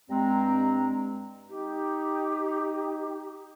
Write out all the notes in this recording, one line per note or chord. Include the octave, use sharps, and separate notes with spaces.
G2 G#3 C4 A#5
D#4 G4